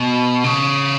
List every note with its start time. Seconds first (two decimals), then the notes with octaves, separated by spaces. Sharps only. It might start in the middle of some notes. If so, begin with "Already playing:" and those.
Already playing: B2
0.44 C#3